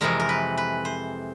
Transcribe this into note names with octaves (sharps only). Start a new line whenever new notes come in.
F2 C3 E3 G#3 A#4
A#4
B4
B4
C5